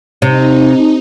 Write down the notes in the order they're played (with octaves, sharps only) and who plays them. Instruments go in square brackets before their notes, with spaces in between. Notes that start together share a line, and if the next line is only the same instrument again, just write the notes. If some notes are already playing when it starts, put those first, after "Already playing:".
[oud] C3 [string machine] D#4